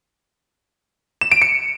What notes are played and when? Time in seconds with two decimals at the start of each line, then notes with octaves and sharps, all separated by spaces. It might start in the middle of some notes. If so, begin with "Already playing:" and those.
1.21 E7
1.32 D7
1.42 C#7